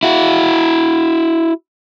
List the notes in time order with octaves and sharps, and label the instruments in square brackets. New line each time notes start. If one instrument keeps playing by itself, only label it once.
[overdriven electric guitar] E4 F#4